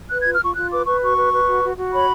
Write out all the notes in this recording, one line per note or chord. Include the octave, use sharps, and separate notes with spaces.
B4 F#6
G#6
F4
F6
F4 C#6
F4 F#6
B4 D6
B4 C#6
F#4 C#6
B4
B4
F#4
F#4
F#4
C#5 B5